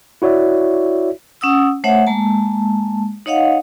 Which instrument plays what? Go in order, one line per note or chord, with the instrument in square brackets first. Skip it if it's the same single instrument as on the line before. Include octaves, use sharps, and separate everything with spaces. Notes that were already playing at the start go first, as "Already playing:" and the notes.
[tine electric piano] E4 F#4 C#5 D5 E5
[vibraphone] C#4 F#5 D#6 E6
A3 C5 C#5 E5 F#5
G#3 A#3 A5
D#4 C#5 D#5 F5 F#5